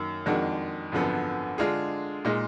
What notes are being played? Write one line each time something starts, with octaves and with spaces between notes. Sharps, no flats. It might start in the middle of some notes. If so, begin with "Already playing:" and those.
Already playing: F#2 D#3 A#3
F2 D#3 G#3 D4 F#4
G#1 F#2 D3 F3 B3
D3 G#3 D4 F4 G#4
A#2 G#3 D#4